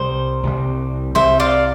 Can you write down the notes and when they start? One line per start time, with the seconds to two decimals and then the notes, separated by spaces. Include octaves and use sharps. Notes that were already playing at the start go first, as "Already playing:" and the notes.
Already playing: C2 C3 G3 C5
0.43 C2 C3 G3
1.15 C2 C3 G3 C5 E5
1.40 D5 F5